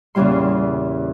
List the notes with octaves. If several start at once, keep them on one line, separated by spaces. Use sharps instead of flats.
E2 A#2 C#3 E3 G3 C6